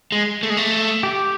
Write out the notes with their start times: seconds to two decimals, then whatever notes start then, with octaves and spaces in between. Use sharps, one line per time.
0.12 G#3
0.43 A3
0.50 G#3
0.57 A3
1.03 G4